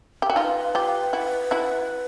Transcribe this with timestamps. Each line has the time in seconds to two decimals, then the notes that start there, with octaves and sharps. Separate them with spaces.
0.22 G4
0.30 F#4
0.36 D#4 F4 B4
0.75 F4 G4
1.13 E4 F#4
1.51 E4 F#4